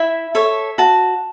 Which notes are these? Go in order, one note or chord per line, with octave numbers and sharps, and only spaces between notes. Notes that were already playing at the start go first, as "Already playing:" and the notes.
Already playing: E4 E5
A4 C#5 E5
F#4 A5